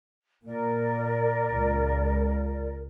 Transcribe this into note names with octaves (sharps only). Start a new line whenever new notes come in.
A#2 A#4 D5
C#2